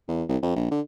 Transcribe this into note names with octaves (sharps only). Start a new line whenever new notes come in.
E2
C2
F2
A#1
D3